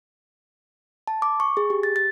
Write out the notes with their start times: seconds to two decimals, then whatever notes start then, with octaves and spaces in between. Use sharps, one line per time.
1.07 A5
1.22 D6
1.40 C#6
1.57 G#4
1.70 G4
1.83 A6
1.96 A6